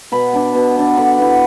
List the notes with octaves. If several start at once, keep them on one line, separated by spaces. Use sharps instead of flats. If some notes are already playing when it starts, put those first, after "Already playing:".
B2 B5
B3 D4
B2
B3 D4
D3 B5
B3 E4